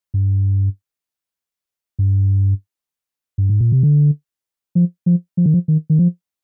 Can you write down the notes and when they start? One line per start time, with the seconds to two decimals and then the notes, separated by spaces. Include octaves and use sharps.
0.14 G2
1.99 G2
3.38 G2
3.49 G#2
3.61 A#2
3.72 C3
3.83 D3
4.75 F3
5.06 F3
5.37 F3
5.46 D#3
5.54 F3
5.68 D#3
5.90 D#3
5.99 F3